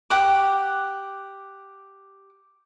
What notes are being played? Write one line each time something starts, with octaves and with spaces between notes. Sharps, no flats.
G4 F#5 D6